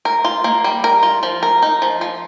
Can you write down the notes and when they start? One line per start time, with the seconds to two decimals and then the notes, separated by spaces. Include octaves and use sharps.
0.05 A#4
0.25 F4
0.44 A#3
0.64 G3
0.84 A#4
1.03 F4
1.23 F3
1.43 A#4
1.62 D#4
1.82 F3
2.01 F3